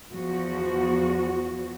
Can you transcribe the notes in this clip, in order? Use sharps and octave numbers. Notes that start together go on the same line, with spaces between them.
E2 F3 F#4